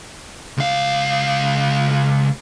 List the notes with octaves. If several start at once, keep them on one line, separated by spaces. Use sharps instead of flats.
C#2 F5